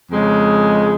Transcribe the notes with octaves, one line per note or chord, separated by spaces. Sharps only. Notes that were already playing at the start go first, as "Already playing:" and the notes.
F2 C#3 G#3